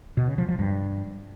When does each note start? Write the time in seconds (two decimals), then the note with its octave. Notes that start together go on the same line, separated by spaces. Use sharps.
0.17 B2
0.28 C#3
0.38 F3
0.49 F3
0.59 G2